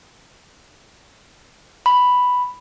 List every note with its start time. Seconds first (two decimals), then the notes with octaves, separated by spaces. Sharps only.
1.86 B5